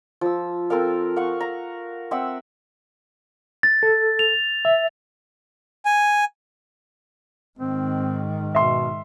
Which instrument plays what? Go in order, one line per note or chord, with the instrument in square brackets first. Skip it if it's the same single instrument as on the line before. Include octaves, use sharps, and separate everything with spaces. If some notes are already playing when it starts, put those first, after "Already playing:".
[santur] F3 E6
C4 A4 A#4 F5
F5 F#5 C#6
A#5
C4 E5 F#5 E6
[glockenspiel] A6
[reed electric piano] A4
[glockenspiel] F7
[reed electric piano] E5
[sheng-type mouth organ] G#5
[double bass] G#2 D#3 [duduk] C4
[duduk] B2 [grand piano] E5 C6